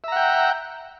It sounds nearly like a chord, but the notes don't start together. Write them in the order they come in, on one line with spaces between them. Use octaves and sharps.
E5 A#5 F#5 G5